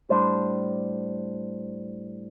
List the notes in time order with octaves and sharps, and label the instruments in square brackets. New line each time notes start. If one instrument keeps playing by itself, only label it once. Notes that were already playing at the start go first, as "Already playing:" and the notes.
[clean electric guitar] A2 G3 D4 C5